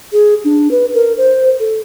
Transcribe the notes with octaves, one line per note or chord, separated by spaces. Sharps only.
G#4
D4
B4
A#4
C5
A4